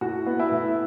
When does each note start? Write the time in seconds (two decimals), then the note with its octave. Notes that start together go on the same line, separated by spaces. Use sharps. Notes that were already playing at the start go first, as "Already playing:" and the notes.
0.01 A2 F#4
0.27 B3
0.39 E4
0.52 A2